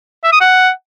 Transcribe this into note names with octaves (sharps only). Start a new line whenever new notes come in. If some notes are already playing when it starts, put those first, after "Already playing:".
E5
D#6
F#5